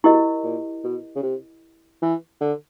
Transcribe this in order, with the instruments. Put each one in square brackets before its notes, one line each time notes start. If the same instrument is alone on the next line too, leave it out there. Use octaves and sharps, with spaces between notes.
[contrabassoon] B2 [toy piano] E4 G4 A#4 D#5
[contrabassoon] A#2
B2
C#3
C3
E3
D3